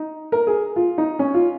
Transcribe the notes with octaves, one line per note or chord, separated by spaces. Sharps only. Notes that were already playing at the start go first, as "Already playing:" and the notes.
Already playing: D#4
A#4
G#4
F4
D#4
C#4
F4